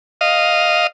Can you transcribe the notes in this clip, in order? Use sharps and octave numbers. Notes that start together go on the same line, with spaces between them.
D#5 F5